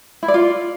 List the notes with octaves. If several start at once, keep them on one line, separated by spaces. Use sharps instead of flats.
E4
D5
F4